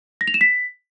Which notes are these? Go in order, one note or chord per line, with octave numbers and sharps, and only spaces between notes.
A#6
F7
E7
B6